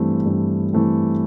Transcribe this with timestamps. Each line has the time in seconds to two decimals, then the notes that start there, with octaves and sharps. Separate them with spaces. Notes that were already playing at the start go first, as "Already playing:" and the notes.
Already playing: G2 E3 A3 C4
0.26 G2
0.74 E3 A3 C4